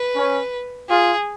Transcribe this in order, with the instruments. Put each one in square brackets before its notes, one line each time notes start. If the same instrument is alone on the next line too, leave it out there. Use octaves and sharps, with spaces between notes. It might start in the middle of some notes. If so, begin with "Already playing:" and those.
Already playing: [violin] B4
[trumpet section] C#4
[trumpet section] F4 [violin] G#4